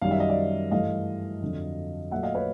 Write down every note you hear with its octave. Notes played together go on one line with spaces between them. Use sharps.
F#2 D#3 G3 F5
E5
D#5
D5 E5
G2 E3 A3 D#5 F5
F2 D3 F#3
A#2 F#3 A3 E5 F#5
D#5 F5
B4 C#5